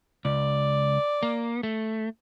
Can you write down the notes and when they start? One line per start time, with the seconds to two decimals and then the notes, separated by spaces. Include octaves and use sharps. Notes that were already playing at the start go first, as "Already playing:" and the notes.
0.25 C#2 D5
1.23 A#3
1.63 A3